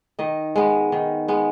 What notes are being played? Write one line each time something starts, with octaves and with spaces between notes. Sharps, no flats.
D#3 D#5
G#3 B3
D#3
G#3 B3